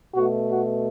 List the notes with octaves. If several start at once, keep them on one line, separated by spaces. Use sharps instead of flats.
B2 A3 F#4
F#4